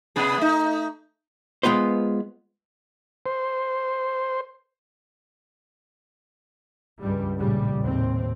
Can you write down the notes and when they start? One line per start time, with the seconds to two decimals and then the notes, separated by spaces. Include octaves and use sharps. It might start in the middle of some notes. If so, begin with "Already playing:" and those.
0.16 C3 B3 G#4
0.38 A3 D#4
1.63 G#3 B3 F4 B4 C5
3.26 C5
7.02 C#2 G2 G3
7.38 A#1 A2 C#3 G3
7.78 D#2 A2 C4